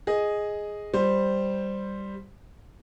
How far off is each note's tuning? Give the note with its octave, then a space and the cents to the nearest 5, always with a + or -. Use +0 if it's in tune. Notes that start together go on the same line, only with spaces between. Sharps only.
G#4 +0 D#5 +0
G3 +0 C5 +0